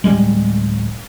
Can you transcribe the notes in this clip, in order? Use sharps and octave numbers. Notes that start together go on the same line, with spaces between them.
D1 E2 G3 G#3